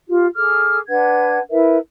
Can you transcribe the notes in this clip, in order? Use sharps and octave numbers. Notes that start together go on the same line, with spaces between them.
F4 G4
G#4 A4 D6 F6
D4 B4 F#5 G#6
E4 A#4 B4 E5